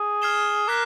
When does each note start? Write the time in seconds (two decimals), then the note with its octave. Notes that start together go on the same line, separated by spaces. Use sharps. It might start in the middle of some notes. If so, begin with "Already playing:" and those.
Already playing: G#4
0.22 F6 G#6 C7 E7 G7
0.68 A#4 D6 F#6 B6